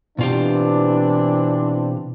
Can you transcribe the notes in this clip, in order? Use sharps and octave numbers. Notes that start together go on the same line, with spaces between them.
B2 E3 C4 D4 F4 G4